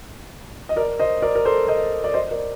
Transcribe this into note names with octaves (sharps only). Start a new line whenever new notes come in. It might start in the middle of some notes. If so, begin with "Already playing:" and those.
D#5
A#4 D5
C5 D#5
A#4 D5
A#4
A4 C5
C5 D#5
D5
C5 D#5
A#4 D5